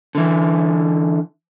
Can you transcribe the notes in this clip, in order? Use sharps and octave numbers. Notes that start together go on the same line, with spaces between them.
D3 E3